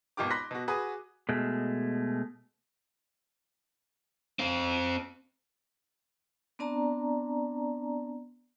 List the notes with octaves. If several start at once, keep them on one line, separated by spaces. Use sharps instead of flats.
G#1 B2 F4 G4 D6
B5 C6 F#6 A#6 B6
B2 F#4
F#4 G#4 B4 D#6
B2 G#3 A3
C4 F5
B3 C4 D4 D5 A5 A#5